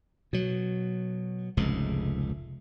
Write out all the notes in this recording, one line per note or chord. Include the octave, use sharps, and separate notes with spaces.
B2 F#3
F1 C#2 G#2